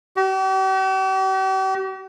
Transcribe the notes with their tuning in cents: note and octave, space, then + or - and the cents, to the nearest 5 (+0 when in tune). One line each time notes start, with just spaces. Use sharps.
G4 -45